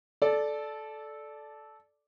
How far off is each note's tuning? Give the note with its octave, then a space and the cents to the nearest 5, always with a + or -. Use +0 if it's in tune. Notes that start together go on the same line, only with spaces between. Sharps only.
A4 -15 D5 +0